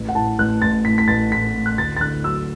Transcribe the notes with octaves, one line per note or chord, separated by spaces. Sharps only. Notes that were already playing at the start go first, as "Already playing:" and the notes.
Already playing: A1
F#5
A2 A5
A1 F#6
A1 A6
A2 B6
B6
A1 A6
A2 B6
A2
F#6
D2 A6
A6
D3 F#6
F#3 E6